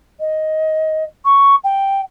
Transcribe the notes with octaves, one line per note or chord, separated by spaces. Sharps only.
D#5
C#6
G5